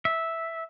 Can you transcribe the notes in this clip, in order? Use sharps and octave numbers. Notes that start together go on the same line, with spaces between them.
E5